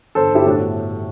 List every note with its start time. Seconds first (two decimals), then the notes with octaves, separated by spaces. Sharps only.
0.15 G1 A4 C5
0.31 G1 E4 G4
0.45 A2 D4 F#4